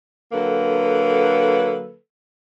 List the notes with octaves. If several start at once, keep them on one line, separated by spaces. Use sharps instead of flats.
D3 F#3 A#3 A4 B4